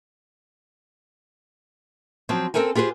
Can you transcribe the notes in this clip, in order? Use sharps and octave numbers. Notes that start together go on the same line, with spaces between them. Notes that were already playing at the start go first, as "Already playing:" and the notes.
F3 F#3 C4
C4 D4 A4 A#4 C5 G#5
F4 G4 G#4 B4 C5